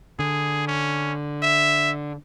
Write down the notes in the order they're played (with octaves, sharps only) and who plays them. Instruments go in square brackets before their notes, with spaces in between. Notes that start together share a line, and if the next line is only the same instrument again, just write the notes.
[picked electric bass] D3 [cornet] G#4
[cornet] C#4
E5